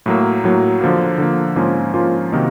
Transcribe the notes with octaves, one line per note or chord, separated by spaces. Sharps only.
A2 F#3 A#3
A2 F#3 A#3
D3 F3 A#3
D3 F3 A#3
G#2 F3 A#3 C#4 F4
G#2 F3 A#3 C#4 F4
C3 D#3 F#3 A#3 D#4